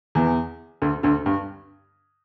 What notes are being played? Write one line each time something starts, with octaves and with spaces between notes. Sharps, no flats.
E2 E3
D2 D3
D2 D3
G2